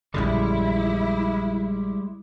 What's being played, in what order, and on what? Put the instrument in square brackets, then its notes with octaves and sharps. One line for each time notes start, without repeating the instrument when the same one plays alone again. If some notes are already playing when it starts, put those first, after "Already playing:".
[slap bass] A#1 F#2 D3 [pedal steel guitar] G3 G#3 [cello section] E4